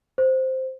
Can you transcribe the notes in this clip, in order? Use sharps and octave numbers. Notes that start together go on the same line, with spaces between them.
C5